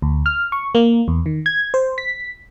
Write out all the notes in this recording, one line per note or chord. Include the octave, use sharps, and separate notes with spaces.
D2
F6
C#6
A#3
E2
D#3
G#6
C5
B6